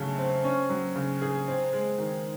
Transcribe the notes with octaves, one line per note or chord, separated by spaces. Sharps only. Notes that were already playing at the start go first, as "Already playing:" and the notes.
Already playing: C#3 F#3 A3
C4
C#4
F#3
C#3
G#4
C4
G#3
D#3